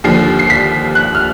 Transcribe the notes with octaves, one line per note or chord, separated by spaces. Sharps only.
D#2 D3 F3 C7
C7
B6
F#6
F6